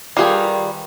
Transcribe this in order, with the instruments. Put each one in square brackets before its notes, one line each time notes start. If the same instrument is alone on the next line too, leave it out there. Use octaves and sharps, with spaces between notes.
[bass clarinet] D#3 [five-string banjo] G3 F4 G#4 [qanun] G4 B4 F5